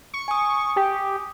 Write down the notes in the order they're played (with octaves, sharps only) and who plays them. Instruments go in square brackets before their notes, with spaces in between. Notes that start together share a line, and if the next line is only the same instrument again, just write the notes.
[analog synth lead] C#6
[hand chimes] G#5 D#6
[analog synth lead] G4